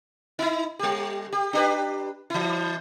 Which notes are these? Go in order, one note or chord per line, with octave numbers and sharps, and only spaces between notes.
D#4 E4
G3 G4
G4
D4 G4 B4
E3 E4